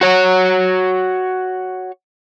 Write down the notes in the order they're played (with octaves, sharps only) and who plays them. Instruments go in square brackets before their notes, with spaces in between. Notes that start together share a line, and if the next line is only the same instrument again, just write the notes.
[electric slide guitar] F#4 C#5